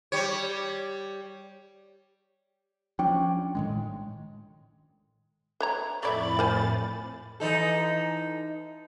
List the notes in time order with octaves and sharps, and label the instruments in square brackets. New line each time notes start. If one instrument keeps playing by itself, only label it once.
[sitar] G3 C#5
[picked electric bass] F3 C#4 D4 [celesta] G5
[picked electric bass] A2 D#3 G#3
[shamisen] B4 C#5 A#5
[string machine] F2 A2 A6 [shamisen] A3 D5 E5 [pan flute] B5
[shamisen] A#4 C5 G#5
[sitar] E3 D#4 A4